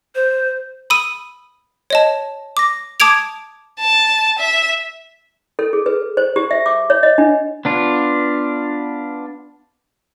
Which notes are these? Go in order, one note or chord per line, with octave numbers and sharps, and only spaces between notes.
C5
B5 D#6 E6 D#7
C#5 D#5 A5
D6 A#6
A5 D6 D#6 G#6 D7 F7
A5
E5
A4
G#4
B4
C5
G4
E5
D6
C#5
D#5
D4
B3 D4 F4